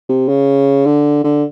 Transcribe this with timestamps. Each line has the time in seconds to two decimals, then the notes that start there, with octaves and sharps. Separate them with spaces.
0.09 C3
0.29 C#3
0.86 D3
1.24 D3